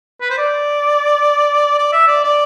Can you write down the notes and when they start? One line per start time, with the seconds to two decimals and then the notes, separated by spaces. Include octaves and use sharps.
0.21 B4
0.30 C5
0.38 D5
1.78 D5
1.92 E5
2.08 D5
2.24 D5